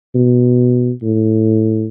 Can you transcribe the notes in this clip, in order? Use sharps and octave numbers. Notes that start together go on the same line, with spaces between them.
B2
A2